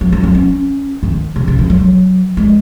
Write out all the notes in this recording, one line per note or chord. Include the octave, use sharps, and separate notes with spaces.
F#3
F#3
D#4
C#4
D#3
C3
C#3
E3
F#3
G#3